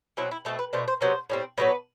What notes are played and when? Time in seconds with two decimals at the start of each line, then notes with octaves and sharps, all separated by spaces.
0.17 B2 F#3 C4 E4
0.31 E4
0.45 B2 A3 C4 A4
0.59 B4
0.73 B2 A3 D4 C5
0.88 C5
1.01 C3 F#3 B3 C5
1.30 A2 G3 C4
1.58 A2 F#3 B3 D4 B4